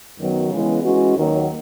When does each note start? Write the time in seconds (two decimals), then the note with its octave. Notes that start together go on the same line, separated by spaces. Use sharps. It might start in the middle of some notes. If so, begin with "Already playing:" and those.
0.17 F#2 D#3 F#3 B3
0.50 C#3 E3 G#3 B3
0.83 E3 G#3 C#4 F#4
1.15 D#2 D#3 F#3 A#3